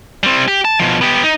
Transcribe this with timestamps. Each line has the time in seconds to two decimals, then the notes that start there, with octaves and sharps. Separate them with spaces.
0.23 G3 C4
0.48 G4
0.65 A5
0.80 B2 F3
1.01 B3 G4
1.23 D#4